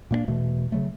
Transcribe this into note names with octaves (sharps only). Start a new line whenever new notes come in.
A#2 A#3 B3 D4
E1 B2 E3 A3
C#3 F#3 A3